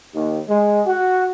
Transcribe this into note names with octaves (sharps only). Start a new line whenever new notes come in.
D#2
G#3
F#4